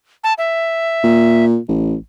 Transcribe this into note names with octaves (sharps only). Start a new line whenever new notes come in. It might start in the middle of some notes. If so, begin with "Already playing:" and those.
A5
E5
A#2
A1